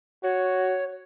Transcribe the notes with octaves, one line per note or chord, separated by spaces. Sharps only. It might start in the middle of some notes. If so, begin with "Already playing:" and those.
F#4 C#5